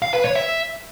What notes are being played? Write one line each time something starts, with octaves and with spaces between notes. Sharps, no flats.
F5
B4
C#5
E5